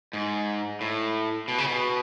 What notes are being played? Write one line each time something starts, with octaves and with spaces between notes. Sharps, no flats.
G#2
A2
B2
C#3
B2